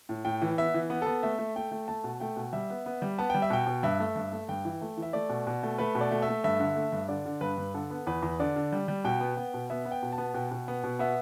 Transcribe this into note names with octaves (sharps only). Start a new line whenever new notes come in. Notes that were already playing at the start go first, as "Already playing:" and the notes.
A2
A2 G5
E3
B3 E5
E3
B3
B3 A4
A3 E5
A3
A3 G5
A3
A3 A5
B2
A3 G5
B2
G3 E5
B3
B3
G3
B3 A5
G3 G5
E5
B2 G5
B2
G2 E5
A3
G2
A3
G2 G5
E3
A3
E3
E5
A3 D5
B2
B2
A3
A3 B4
B2
D5
A3
E5
A3
G2 E5
D3
A3
G2
D3 D5
D3
G2 B4
G2
D3 A4
B3
E2 B4
E2
D3 D5
D3
G3
G3
B2 G5
B3
B3
B2
B3 E5
B3
G5
B2
A5
B3
B2 G5
B2
B3
B2
B3 E5